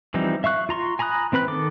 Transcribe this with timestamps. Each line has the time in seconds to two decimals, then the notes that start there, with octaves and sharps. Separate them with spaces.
0.14 E3 F3 G3 C4 D#4
0.44 E5 F5 C#6 F#6
0.69 F4 A#5 C6 C#6
0.99 G#5 A#5 B5 D#6 F#6
1.32 E3 C4 B4 B5 F#6
1.48 D#3 A4 D6